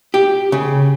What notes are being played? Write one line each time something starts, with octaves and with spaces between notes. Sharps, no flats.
G4
C#3